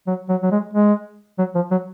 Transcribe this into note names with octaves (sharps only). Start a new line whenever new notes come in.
F#3
F#3
F#3
G#3
G#3
F#3
F3
F#3